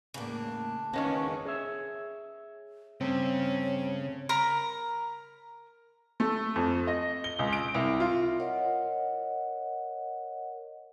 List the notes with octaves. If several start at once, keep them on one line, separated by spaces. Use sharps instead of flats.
E2 A2 C#3 A#3 D4
D#3 E3 G#3 A#3 B3 C#4
G#4 C#5 E5
G2 C#3 A3 C4 C#5
A#4 A#5 B5
A3
F2
D#5
G7
C#2
D7
C2
F4
A#4 C#5 D#5 F#5